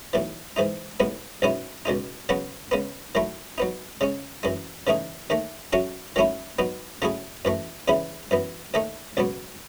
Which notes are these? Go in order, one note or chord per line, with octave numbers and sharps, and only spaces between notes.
B1 A2 E3
G#2 E3 G#3 D#4
B1 A2 G#3 B3
B1 B2 G#3 C#4 E4
C#2 B2 G#3 D#4
C#3 F#3 B3 F#4
C#3 G#3 B3
D#3 F#3 A3 E4
F#3 B3 D#4
C#3 G#3 C#4
F#2 E3 G#3
C#3 E3 A3 D#4 G#4
D#2 D#3 A3
F#3 C#4 F#4 A4 E5
D#3 F#3 A3 C#4 E4
F#3 B3 D#4
C#3 F#3 A3 E4 G#4
F#2 E3 A3
E2 C#3 E3 B3 E4
F#2 E3 B3
D#2 D#3 A3 D#4 A4
C#2 B2 F#3 B3